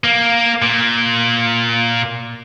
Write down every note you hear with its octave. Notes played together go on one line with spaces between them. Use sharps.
A#3
A#2